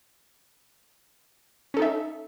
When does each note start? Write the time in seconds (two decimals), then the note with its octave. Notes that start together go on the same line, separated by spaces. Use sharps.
1.74 C#4
1.77 A4
1.79 D#4
1.82 E5